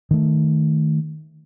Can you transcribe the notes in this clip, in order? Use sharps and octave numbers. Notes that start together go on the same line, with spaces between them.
D#3 A3